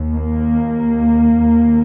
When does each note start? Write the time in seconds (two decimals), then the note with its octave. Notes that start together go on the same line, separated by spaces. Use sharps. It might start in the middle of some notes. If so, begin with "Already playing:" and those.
Already playing: D#2
0.14 A#3
1.39 D#2